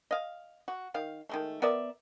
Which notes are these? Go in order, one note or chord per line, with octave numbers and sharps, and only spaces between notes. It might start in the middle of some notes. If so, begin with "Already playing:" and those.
D#5 F5
F#4
D#3 F5
D#3 G#3 A3
B3 A#4 D5 E5